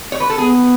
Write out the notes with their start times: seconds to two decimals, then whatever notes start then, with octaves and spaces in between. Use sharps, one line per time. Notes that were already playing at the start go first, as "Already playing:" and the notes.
0.12 C#5
0.20 B4
0.30 A4
0.38 B3 G#4